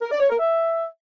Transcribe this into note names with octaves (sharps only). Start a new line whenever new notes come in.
A#4
D5
C#5
A#4
E5